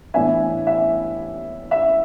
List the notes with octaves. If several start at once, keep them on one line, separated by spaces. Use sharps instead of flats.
A2 E3 B3 D4 E5 G#5
E5
E5